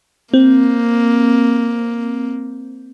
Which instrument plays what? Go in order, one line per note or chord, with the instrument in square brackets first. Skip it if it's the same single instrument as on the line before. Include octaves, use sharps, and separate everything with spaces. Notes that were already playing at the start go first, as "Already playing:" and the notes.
[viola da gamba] A#3 [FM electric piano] C4